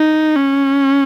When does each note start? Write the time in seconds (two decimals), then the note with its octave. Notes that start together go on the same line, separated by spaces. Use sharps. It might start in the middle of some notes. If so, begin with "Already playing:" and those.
Already playing: D#4
0.36 C#4